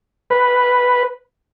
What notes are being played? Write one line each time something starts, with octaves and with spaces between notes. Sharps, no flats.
B4